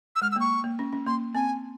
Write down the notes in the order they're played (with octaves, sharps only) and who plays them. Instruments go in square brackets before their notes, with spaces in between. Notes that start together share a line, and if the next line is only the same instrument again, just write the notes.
[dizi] E6
[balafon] G#3 [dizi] F6
[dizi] E6
[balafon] A#3
[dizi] C#6
[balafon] A#3
C#4
C#4
[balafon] A#3 [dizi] C6
[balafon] C4 [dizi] G#5